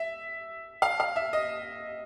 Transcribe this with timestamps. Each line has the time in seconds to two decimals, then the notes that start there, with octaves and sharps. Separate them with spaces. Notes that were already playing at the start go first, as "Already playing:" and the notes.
Already playing: E5
0.82 F5
1.00 F5
1.16 E5
1.33 D#5